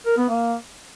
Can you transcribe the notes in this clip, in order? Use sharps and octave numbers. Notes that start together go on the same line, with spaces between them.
A#4
B3
A#3